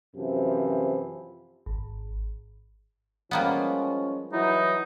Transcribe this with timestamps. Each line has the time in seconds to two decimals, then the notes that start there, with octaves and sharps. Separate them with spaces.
0.15 F#2 C3 E3 F3
1.66 G#1
3.31 F3 G3 G#3 A#3 B3 C#4
4.32 E3 F#3 D#4 E4